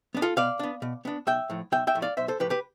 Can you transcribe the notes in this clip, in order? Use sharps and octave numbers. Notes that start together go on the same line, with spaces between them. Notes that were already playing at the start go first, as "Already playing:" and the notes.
B3 D4
F4 A4
B2 D5 F5
B3 D4
B2
B3 D4
B1 E5 G5
A2 F3
B1 E5 G5
E5 G5
A2 F3
D5 F5
B1 C5 E5
A4 C5
A2 F3 G4 B4
G4 B4